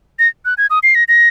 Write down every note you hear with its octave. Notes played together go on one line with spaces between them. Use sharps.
A#6
F#6
G#6
D#6
C7
A#6
A#6